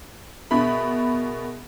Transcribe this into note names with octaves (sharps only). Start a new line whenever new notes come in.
B2 G#4 A#4 E5 B5